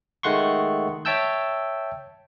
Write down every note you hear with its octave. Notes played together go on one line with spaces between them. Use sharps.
D#3 G#3 A3 F#5 C6 C#6
C#5 E5 G5 A5 E6 G6